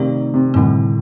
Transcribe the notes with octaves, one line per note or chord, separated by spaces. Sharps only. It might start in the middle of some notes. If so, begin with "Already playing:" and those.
Already playing: C3 D#3 A3 D#4 G4 D5
C3
A2 D3 G3 C4